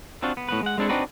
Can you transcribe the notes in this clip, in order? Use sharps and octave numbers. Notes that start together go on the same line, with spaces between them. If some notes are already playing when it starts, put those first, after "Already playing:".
C4 D4 F4 F#4
B3
A2 B3 B4
G#3 F#5
G#3 C4 D4 E4 A4
C4 D4 D#4 F#4 B4